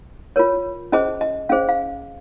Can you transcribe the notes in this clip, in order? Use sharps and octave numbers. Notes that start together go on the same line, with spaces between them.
F4 A#4 C#5
C#4 G#4 C5 D#5
D#5
C#4 G#4 C5 F5
F5